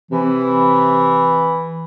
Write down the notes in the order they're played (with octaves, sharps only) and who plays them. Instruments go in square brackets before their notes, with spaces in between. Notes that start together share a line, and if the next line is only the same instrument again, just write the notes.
[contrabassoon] C3 [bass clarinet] E3